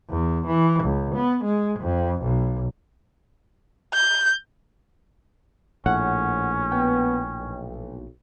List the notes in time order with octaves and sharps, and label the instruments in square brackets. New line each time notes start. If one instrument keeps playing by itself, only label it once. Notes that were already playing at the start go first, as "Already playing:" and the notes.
[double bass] E2
E3
C#2
B3
G#3
F2
B1
[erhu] G6
[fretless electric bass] A#1 A2 [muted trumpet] C#4 [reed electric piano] F#5
[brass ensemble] B3 [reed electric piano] G5
[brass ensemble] B1